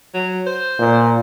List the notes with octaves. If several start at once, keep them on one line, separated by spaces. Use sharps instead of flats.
F#3
C5
A#2